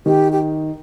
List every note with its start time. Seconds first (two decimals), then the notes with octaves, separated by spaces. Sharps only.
0.06 D#3 G4
0.32 G4